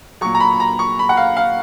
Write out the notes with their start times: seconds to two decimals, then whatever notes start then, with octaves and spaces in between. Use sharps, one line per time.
0.21 A#2 F#3 C#6
0.35 A#5
0.40 B5
0.60 A#5
0.79 C#6
0.99 B5
1.09 F#5
1.17 F5
1.37 F5